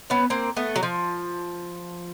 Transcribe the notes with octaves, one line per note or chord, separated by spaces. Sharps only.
B3 C#4
A#3 C4
A3 B3
F#3
F3